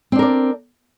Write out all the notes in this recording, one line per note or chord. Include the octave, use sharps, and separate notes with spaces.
C4 D4 A#4 D5